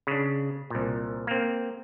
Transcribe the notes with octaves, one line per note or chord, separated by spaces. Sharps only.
C#3 D4
C2 A#2
A#3 C4